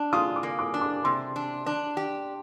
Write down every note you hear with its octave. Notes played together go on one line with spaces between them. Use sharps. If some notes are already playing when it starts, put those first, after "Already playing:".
Already playing: D4
F4 D#6
D6
A#3
D6
D4
D6
C3 C6
D4
D4
G4